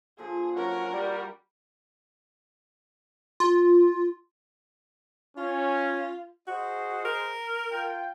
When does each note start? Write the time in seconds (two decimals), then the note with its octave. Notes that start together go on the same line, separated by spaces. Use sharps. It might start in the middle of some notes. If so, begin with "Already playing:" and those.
0.18 A#2 D3 F3 G#4
0.55 F#3 C#4 F#4 A#4
0.92 G3
3.40 F4
5.37 C#4 F4
6.47 F#4 G#4 C5 D#5
7.05 A#4
7.70 F4 G5